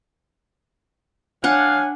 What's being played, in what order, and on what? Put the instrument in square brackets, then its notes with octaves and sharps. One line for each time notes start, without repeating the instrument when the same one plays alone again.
[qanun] D4 F#5 [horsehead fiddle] C#5 G#5 [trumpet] F5